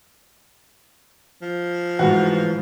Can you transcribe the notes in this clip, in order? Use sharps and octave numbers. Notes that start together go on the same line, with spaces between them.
F3
G#2 E3 A3 F#4